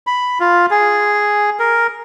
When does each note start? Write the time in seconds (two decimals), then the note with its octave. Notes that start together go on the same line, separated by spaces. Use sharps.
0.07 B5
0.40 F4
0.71 G#4
1.59 A#4